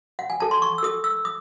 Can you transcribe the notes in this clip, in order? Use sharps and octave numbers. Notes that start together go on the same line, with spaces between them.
F#5
G#5
A4 A5
C6
C#6
E6
A4 D#6
E6
D#6